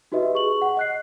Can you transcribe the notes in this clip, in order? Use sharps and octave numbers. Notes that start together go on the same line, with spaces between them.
D#4 F#4 G4 B4 D#5 E5
G#4 C#6 F#7
F#5
D#5 F#6 C7